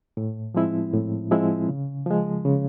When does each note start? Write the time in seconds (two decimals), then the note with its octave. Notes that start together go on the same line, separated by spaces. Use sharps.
0.17 A2
0.54 F3 G#3 C4 E4
0.94 A2
1.31 F3 G#3 C4 E4
1.69 C#3
2.06 F3 G#3
2.45 C#3